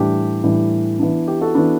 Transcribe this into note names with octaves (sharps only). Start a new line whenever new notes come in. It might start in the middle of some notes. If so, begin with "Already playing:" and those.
Already playing: A2 E3 G3 D4 G4
A2 E3 G3 D4
E3 B3 D4
G4
F#4 A4
E3 B3 D4